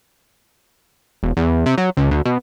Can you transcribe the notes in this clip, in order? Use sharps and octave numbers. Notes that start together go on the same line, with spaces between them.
E1
E2
C3
F#3
C#2
D2
B2